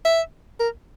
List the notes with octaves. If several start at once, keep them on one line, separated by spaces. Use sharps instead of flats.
E5
A#4